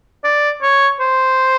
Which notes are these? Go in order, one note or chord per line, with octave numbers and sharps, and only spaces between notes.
D5
C#5
C5